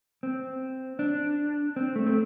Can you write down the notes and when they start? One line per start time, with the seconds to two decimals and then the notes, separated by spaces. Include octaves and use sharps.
0.23 C4
0.99 D4
1.76 C4
1.96 A3
2.06 C4